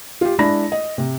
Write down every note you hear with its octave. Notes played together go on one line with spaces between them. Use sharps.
F4 G4
G#3 D4 E4 B5 A#6
D#5
C3